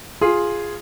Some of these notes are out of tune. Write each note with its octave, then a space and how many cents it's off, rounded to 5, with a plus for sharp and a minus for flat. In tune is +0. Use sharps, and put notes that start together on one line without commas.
F4 +0 G#4 +0